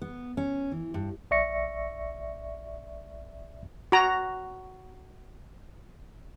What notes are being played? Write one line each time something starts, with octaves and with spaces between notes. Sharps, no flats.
B3
C#4
E3
G2
A#1 D5 E5 C#6 A#6 C#7
F#4 A#5